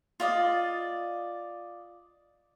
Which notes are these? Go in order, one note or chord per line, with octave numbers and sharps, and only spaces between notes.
F4 D5 D#5